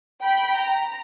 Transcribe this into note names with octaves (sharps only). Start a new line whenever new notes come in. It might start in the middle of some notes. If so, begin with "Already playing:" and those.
G5 B5
A#5